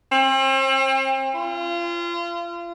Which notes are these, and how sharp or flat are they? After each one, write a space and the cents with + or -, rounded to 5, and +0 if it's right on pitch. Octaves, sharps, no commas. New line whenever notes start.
C4 +40
F4 -30